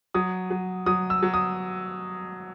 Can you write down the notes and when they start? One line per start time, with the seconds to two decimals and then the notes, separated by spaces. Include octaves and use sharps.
0.14 F#3 D#6
0.51 F#3
0.86 F#3 D#6
1.10 E6
1.23 F#3
1.34 D#6